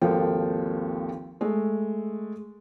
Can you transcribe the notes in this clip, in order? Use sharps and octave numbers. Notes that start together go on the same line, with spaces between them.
G#1 D#2 F3 A#3 A4 G5
G#3 A3